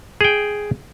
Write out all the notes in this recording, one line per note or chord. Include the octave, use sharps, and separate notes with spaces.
G#4 G5